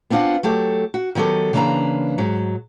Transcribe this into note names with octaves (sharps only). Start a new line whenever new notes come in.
B3 C4 D4 F4 F#5
F#3 A3 G4 A4
F#4
D#3 F#3 B3 G4 A4
C#3 E3 A#3 D4 B4 A#5
G#2 F#3